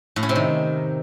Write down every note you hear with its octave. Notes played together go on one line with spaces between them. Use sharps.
A2
C#4
C3
D#3